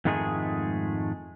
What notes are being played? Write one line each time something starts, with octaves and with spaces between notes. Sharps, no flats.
F2 G#2 D#3 G#3 A3 G#4